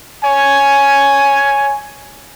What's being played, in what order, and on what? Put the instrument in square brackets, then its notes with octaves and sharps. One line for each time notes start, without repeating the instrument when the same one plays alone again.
[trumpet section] C#5 G#5